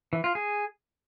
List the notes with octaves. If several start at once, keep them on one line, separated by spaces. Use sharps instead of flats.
E3
F4
G#4